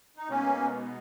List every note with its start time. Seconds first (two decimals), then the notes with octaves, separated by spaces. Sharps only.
0.17 D#4
0.29 B2 G#3 A#3 B3 C#4 D#4